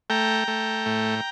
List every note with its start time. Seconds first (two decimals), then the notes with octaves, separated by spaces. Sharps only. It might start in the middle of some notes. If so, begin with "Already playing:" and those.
0.10 A3 G5 A#5
0.48 A3
0.86 A2